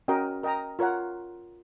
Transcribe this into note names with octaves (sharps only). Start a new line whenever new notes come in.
C#4 F#4 A#4 D#5 G5
A#4 D#5 G5 A#5
F4 A#4 C#5 F#5